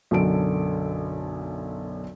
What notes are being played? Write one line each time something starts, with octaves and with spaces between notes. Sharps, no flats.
B1 F#2 D3 A4 D7